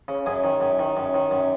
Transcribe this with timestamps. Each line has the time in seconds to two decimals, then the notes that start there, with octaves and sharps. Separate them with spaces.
0.08 C#3
0.26 F#2 G#4
0.44 D#3
0.61 F#2
0.79 D#3
0.97 F#2
1.14 D#3
1.31 F#2